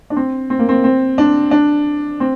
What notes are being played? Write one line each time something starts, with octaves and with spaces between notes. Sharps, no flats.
D4
C4
C4
A#3
C4
C4
D4
D4
C4